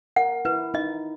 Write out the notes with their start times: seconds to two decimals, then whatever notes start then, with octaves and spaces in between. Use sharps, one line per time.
0.16 A#4 F#5
0.45 E4 B4
0.74 D#4 D#5